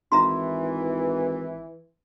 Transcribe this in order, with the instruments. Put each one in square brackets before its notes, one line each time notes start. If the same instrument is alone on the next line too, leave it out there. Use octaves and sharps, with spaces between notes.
[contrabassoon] G#1 [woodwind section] E3 [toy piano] E5 A#5 C6